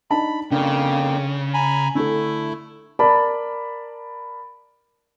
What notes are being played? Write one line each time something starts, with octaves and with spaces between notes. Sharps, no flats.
D4 D#4 A5 B5
F2 C#3 A#3 D4 G5
G#5 A#5 B5
D3 A3 E4 A4
A#4 D5 A5 B5